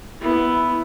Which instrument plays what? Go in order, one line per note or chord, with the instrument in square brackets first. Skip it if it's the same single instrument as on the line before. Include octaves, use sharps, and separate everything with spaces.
[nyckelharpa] B3 [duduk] E4